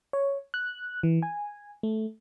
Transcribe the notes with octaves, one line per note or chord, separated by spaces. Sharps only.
C#5
F#6
E3
G#5
A3